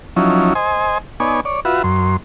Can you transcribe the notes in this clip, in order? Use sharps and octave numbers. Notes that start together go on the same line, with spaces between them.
F3 F#3 C#4 D#4 E4
C5 D#5 G#5
B3 D#4 C#5 D5 G#5
C#5 D5
F4 F#4 B4 E5
F#2 C6